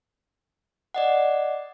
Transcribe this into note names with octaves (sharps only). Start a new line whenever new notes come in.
D5 D#5 F#5